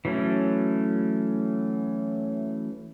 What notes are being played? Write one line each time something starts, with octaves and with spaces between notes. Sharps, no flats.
E3 F#3 A3 C#4